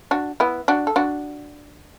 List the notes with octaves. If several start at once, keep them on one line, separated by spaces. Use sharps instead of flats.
D4 F#4
B3 E4
D4 F#4
A4
D4 F#4